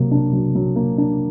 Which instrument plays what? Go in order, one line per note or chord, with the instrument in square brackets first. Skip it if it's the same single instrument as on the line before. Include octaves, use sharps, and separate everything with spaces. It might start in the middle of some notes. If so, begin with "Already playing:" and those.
Already playing: [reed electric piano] C3 [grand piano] F#3 A#3
[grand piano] D4
F#3
F#3
A#3
D4